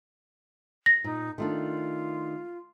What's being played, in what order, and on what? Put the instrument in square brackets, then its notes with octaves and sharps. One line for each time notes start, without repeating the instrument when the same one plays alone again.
[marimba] A#6
[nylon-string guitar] A#2 [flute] D#4
[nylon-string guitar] D#3 A3 D4 [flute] F4